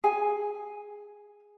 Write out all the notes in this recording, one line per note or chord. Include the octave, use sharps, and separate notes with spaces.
G#4 G#5